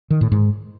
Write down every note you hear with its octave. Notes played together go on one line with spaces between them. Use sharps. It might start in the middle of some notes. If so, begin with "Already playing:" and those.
D#3
A2
G#2